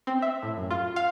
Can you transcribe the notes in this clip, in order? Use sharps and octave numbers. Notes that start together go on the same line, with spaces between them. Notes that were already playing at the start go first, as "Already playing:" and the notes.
C4
E5
A2
F#2
F4
F5